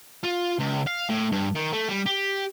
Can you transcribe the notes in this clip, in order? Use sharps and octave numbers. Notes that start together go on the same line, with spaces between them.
F4
C#2
F5
A2
G2
D#3
A3
G3
G4